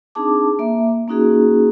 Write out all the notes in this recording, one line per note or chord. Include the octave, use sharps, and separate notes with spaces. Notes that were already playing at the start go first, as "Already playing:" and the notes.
C4 D4 D#4 G#4 A5 D6
A#3 E5
A#3 C#4 D#4 F#4 G#4